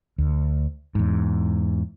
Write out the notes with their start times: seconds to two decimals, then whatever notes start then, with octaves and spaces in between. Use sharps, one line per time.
0.18 D2
0.95 E2 G#2